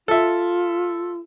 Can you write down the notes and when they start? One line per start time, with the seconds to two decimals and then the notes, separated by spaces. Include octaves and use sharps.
0.08 F4 A4 E5